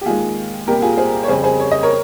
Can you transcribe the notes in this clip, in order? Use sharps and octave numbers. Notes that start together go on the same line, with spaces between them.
G4
D#2 D#3 G#3 F4 G#4
C2 A#2 G3 G4 A#4
F4 G#4
G#4 C5
C#5
F2 C#3 G3 G#4 C5
G#4 C5
C#5
D#5
A#4 C#5